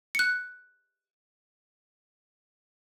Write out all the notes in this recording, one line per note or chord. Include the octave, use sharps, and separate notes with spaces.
F#6 C#7